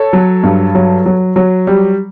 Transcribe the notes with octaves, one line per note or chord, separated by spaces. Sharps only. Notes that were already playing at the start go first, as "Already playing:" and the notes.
Already playing: A4 C#5
F#3
G2
F#3
F#3
F#3
G3